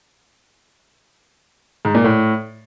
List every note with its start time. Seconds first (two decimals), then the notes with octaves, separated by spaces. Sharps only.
1.85 G#2
1.95 A#2
2.04 A2